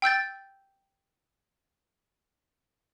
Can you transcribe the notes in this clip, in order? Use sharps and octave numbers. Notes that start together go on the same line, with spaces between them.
G5 E6 G6 A6